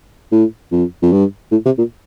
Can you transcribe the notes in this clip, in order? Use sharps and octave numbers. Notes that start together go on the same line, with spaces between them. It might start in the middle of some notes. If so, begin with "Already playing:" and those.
A2
F2
F2
G2
A2
C3
A#2